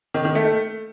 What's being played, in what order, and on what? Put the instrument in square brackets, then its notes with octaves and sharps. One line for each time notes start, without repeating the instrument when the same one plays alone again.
[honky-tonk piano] D#3
D#3
A3